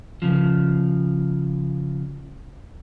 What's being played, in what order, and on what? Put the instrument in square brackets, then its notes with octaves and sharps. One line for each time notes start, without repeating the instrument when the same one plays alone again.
[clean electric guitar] C#3 F3